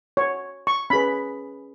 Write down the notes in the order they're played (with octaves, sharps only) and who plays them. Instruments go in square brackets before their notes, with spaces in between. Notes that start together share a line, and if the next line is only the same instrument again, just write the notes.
[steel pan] C#5
C#6
C#4 G#4 B4 B5